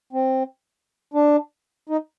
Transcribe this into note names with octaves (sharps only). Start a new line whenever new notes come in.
C4
D4
D#4